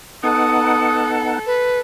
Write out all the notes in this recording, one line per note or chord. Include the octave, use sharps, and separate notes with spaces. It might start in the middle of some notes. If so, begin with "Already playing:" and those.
B3 D#4 A4 F#5 D#6
B4